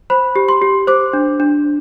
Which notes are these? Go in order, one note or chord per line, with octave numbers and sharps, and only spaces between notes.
C5 B5
G4
C6
G4
C5 D6
D4
D4